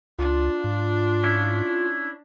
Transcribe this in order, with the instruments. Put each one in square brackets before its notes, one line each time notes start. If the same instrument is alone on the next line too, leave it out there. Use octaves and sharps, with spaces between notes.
[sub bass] C#2 [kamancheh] D4 [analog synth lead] F4
[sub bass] G#2
[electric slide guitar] C#4 E4